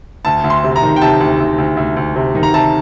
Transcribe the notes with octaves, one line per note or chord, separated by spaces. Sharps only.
D2 A5
D2
C6
C3
A#5
D#3
G5
C3 A5
D2
D2
D2
D2
D2
C3
D#3
A#5
C3 A5